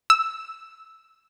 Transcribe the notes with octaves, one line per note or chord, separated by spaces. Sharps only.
E6